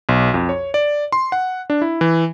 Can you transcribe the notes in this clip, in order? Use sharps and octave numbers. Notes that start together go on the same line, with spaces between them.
B1
F2
C#5
D5
C6
F#5
D4
E4
E3